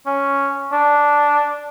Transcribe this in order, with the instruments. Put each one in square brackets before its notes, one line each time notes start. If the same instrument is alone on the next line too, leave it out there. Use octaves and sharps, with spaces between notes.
[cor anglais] C#4
D4